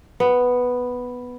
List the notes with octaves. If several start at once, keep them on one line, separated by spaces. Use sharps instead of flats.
B3